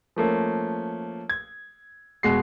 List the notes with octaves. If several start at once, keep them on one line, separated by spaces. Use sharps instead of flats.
F3 A3 A#3 C#4
G#6
E1 B2 G#3 G#4 C7